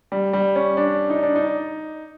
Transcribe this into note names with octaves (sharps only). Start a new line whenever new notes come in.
G3
G3
C#4
D4
D#4
D4
D#4